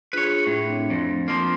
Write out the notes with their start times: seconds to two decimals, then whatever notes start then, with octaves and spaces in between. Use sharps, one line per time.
0.13 D4 F4 G#4 B4 C#5
0.47 A2
0.69 A3 C4 D4
0.90 F2
1.28 F3 A#3 C4